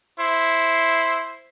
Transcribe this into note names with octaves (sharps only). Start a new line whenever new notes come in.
E4 C5